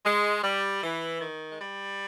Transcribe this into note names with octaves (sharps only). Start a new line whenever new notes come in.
G#3
G3
E3
D#3
G#3
G3